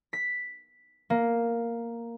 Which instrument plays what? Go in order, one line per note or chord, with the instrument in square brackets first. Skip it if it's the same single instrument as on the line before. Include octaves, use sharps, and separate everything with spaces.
[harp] B6
A#3